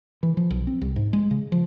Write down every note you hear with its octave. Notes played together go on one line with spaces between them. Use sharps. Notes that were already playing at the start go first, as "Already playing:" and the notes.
E3
F3
B1
C4
C2
G#2
G#3
C#3
F3